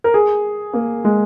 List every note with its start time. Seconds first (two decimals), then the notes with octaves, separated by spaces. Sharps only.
0.04 A#4
0.14 G#4
0.73 A#3
1.05 G#3